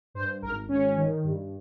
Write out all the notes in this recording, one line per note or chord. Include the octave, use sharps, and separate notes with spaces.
G2 C5
G#1 A#4
G#1 C#4
D#3
G2